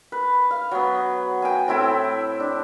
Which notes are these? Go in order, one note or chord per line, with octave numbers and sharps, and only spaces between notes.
B4
F5
F#3 B3
G5 G#5
A2 C4 E4 A4
D4